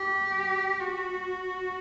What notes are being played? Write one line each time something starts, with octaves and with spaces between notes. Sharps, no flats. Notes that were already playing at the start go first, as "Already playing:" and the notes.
Already playing: G4
F#4